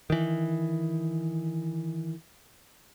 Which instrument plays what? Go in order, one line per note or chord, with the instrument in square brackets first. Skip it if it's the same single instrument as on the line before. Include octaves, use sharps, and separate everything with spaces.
[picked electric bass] D#3 E3